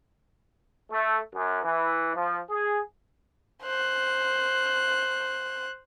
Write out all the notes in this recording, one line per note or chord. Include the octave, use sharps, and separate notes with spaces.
A3
F#2
E3
F3
G#4
C5 F#6